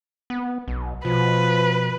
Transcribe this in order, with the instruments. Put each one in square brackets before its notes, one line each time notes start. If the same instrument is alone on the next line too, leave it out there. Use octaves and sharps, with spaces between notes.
[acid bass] B3
B1
[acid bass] B2 [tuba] F3 [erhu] B4